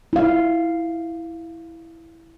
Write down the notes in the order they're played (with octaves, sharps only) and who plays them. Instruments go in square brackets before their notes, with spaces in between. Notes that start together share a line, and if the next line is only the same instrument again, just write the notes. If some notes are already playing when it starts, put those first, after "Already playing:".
[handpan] E4 F5